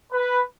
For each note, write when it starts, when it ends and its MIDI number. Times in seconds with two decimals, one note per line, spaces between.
0.13 0.39 71